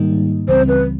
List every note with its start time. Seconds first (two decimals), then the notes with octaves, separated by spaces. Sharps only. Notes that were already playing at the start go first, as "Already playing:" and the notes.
Already playing: G#2 D#3 G3 A#3 D#4
0.48 C#2 C#3 E3 G3 C4 C5
0.68 B4